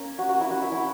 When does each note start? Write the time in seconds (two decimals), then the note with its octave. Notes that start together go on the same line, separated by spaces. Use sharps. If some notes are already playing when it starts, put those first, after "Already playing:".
Already playing: A#3 C#4
0.19 F#4
0.29 F#4
0.41 E4
0.51 F#4
0.62 E4
0.72 E4